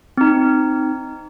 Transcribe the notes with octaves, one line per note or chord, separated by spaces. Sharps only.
C4 D#4